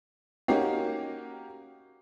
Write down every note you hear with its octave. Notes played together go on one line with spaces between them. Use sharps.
A#3 C#4 D#4 F#4 G4 A#4